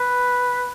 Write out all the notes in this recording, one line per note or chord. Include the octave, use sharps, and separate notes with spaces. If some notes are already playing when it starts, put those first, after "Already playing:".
Already playing: B4